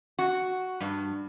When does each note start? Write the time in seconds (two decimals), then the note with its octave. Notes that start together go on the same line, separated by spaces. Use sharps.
0.19 F#4
0.81 G2